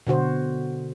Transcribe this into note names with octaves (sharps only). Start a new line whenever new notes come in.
B2 D3 F#4 C5